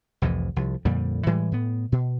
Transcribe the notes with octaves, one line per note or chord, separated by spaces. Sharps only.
C2 F2 A2 E3
C2 F3
F2 A#2 D3 G3
A2 E3 G3 G#3
A2 B3
B2